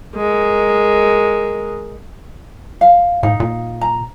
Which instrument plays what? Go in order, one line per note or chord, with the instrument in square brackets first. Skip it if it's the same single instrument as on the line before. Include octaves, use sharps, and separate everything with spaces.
[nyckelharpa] G#3 A#4
[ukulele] F5
[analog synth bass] A2 [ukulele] D#4 F5
[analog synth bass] A#2
[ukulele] A#5